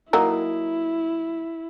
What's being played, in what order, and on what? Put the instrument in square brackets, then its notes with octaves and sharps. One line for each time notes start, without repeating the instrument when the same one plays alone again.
[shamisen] F#3 A#3 D#4 [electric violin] E4